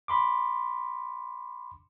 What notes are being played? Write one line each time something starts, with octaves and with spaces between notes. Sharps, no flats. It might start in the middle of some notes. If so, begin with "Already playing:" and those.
B5 C6 D6